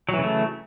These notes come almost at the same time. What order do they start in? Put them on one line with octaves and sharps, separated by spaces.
F#3 E3 C#3 A3